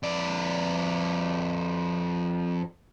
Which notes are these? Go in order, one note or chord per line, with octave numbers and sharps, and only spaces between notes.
F2 D5